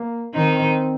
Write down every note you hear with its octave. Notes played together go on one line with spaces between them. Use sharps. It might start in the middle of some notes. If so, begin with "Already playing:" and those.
Already playing: A#3
D#3 C4 D#4